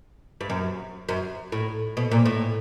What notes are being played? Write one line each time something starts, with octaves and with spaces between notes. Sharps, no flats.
G2
F#2
F#2
A2
B2
A#2
A2